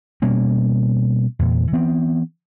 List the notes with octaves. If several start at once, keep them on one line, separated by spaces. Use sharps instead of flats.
B2 G3 A#3 C#4
E2 A#2
E3 B3 C4